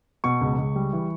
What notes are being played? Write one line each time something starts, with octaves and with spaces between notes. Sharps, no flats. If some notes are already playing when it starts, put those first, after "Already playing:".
B2 C#6
C#2
C#2
G3
E3